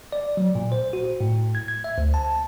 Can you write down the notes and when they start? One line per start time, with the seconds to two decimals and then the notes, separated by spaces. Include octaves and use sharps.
0.12 D5
0.37 F#3
0.55 A#2
0.72 C5
0.93 F#4
1.21 A2
1.55 G#6
1.68 G#6
1.84 E5
1.98 D2
2.14 A5